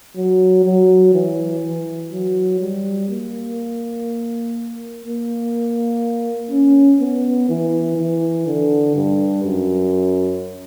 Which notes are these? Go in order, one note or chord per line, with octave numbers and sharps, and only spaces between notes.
F#3
F#3
E3
E3
F#3
G3
A#3
A#3
C#4
B3
E3
E3
D3
G2
F#2